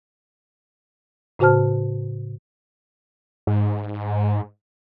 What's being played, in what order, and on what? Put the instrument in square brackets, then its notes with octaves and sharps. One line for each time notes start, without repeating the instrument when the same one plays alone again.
[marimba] A2 C#3 F#4 C5 A5 F6
[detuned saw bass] G#2